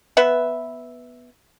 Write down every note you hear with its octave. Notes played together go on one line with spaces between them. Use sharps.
B3 B4 E5